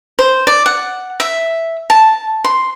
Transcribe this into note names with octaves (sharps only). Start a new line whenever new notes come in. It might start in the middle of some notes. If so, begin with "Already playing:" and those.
C5
D5
F#5
E5
A5
C6